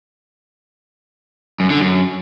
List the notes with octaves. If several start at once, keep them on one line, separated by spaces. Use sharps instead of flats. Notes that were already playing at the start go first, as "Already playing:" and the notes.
F#2
D3
F#2